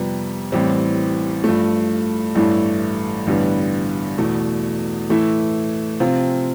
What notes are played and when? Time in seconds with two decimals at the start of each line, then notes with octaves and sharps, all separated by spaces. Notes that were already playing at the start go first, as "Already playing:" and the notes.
Already playing: F2 C3 G3 B3
0.52 A1 A2 E3 G3 C4
1.44 G2 F3 A3
2.35 A1 G2 E3 A3 E4
3.27 A1 G2 D3 G3 B3
4.18 E2 B2 A3
5.09 A2 E3 A3 E4
6.00 C3 F3 C4 F4